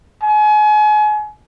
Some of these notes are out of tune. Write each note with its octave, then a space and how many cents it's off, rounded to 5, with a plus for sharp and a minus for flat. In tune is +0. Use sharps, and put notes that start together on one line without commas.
G#5 +35